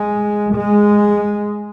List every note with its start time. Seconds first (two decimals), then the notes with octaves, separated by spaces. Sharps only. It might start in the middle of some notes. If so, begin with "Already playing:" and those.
Already playing: G#3
0.56 G#3